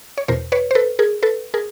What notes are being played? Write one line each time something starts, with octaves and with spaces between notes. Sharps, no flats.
C#5
E2 B2 A#4 C5
B4 C#5
C5
A4 B4
G#4 A#4
A4 B4
G#4 A#4